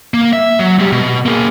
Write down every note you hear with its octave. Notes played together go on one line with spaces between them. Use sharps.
A#3
E5
F#3
G#3 G4
B2
A#3 G#4